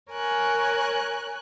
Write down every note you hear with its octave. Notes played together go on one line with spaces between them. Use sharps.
A#4 C#5 G#5 F#6